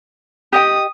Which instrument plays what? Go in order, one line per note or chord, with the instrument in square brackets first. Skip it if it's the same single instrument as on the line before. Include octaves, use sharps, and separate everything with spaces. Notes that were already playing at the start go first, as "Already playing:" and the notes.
[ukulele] G4 D#5 G5 [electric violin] D#6